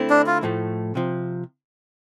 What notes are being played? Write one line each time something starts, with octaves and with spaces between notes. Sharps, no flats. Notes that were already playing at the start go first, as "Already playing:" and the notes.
Already playing: D3 A3 C4 E4
D4
F4
A2 F3 A3
C3 F3